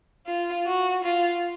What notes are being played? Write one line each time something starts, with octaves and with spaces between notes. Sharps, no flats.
F4
F#4
F4